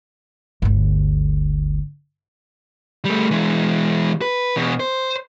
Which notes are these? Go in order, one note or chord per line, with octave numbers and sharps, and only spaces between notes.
G1 D2
G3 A3
E3 G#3
B4
E2 B2
C5